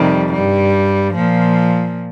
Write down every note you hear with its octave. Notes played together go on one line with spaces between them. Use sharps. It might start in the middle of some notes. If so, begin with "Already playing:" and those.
Already playing: F2 C3 D#3 G3
G2 G3
A#2 F3